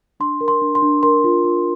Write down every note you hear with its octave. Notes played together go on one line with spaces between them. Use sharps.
D4 C6
A#4
C6
D4
C6
D4
A#4 C6
F4
F4